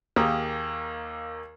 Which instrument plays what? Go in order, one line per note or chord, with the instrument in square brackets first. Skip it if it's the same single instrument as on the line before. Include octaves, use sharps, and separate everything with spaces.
[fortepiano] D#2 A#3 G4 G#4 A#5 D#6